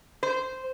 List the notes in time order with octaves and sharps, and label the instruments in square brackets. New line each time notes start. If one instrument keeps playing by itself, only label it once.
[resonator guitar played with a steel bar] C5